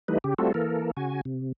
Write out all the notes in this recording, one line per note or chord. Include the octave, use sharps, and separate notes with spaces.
E3 G3 A3 D#4 B4
C#3 G4
G3 A3 C4 F4 F#4 A4
E3 A#3 A4 A#4
C#3 F#4 G#5
C3